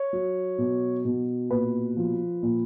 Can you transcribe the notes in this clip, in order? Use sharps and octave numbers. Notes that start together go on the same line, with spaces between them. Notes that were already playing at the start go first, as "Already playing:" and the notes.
Already playing: C#5
F#3
B2
B2
A#2 B4
F3
A#2